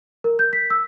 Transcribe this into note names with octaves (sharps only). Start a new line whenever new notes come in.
A#4
G6
B6
E6